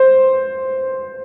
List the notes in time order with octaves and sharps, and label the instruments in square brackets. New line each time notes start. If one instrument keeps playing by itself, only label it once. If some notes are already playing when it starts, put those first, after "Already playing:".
Already playing: [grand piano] C5